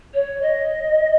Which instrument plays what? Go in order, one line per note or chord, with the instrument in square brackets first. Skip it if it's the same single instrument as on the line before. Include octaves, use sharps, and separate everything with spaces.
[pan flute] C#5
D#5